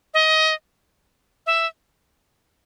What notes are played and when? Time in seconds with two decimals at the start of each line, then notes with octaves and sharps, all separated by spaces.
0.14 D#5
1.46 E5